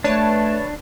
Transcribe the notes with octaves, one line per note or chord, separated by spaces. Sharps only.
A3 D4 B4 C#5 A5